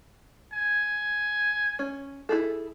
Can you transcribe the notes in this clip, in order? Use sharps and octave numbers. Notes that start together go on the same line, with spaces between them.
G#5
C#4
E4 G#4 A4